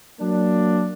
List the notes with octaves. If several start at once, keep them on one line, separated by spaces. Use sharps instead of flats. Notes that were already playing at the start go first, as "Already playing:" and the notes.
F#3 A#3 D4